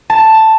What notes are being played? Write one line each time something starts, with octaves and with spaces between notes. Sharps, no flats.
A5